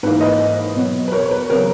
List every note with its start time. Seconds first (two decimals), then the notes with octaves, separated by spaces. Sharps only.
0.03 G#2 E3 A#3 B4
0.21 B4 D#5
0.76 B2 F#3 B3
1.08 B4
1.12 A#4 C#5
1.22 C#5
1.31 B4
1.50 C#3 F#3 B3 A#4